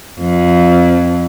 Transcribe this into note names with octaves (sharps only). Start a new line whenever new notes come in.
F2